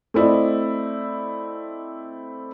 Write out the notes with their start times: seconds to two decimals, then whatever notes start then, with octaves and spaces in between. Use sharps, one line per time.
0.14 A3 C4 E4 D5 D#5